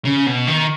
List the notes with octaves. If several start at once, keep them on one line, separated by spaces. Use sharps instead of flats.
C#3
B2
D#3